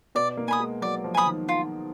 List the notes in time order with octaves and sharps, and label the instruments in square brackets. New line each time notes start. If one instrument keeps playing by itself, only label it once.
[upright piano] B2 [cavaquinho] D5
[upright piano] A#3
[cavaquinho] G#5 B5 D#6
[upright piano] G#3
[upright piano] F#3 [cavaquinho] D5
[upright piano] F3
[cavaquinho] G#5 B5 D#6
[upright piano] D#3
[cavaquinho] F4